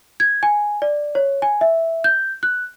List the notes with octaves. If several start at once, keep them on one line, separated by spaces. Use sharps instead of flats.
G#6
G#5
D5
C#5
G#5
E5
G6
F#6